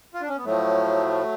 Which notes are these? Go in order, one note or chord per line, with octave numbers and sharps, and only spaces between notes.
F4
D4
C#4
B3
A2 F3 F#3 A3